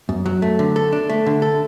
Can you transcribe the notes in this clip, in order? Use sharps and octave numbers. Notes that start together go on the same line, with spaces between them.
F#2
F#3
A3
D3
A4
D4
A3
D3
A4